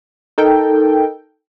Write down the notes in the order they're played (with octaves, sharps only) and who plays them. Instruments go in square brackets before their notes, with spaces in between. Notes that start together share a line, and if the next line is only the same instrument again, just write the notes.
[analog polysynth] D#4 A4 A#4 G5